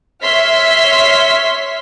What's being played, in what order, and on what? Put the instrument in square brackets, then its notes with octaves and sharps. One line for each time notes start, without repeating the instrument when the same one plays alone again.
[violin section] C#5 E5 C6 F6 B6